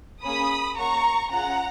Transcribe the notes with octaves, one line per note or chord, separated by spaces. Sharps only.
A#3 C#4 G#4 B5 D#6
A#3 C#4 F#4 A#5 C#6
C#4 F4 G#4 F#5 A#5